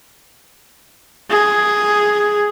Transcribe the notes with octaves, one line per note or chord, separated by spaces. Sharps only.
G#4